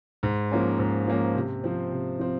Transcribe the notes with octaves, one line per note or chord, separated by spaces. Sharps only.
G#2
F3 A#3 C#4
G#2
F3 A#3 C#4
C3
F3 C4
C3
F3 C4